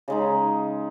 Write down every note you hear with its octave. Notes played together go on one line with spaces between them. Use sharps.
C#3 G#3 D#4